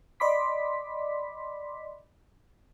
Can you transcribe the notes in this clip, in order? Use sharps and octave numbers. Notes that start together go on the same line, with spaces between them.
D5 D#5 B5 C6 D6 B6